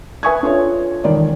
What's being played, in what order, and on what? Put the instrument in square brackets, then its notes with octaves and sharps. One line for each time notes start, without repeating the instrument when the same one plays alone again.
[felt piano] B4 E5 G#5 C#6 D#6 G#6
D4 F4 A4 C#5
E1 D#3 D5